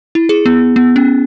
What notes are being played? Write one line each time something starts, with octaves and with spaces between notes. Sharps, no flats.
E4
G#4
B3
B3
C#4